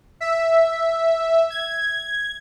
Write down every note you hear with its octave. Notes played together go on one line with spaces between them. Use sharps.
E5
G#6